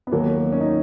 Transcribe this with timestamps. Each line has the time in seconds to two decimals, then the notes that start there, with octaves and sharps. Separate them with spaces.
0.07 B3
0.11 D#2 D#3 F#3 A#3
0.52 C#4
0.60 D#4